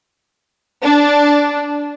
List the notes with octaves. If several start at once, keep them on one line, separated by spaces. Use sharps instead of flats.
D4